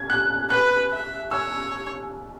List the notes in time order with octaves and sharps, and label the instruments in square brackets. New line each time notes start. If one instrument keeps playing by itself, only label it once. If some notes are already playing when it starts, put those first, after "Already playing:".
Already playing: [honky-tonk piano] G#6
F#6
[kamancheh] B4 [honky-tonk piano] F#6
[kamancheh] E5
[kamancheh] C#5 [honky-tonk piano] E6